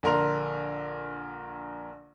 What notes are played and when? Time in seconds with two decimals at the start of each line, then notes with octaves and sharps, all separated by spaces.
0.03 A#1 D3 A#4 C6 F7